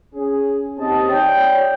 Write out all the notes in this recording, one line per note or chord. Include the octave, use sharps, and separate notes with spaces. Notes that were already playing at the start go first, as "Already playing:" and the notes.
C#4 G#4
D#2 C4 D#4 G4 D#5 A5
C#5 D5 G5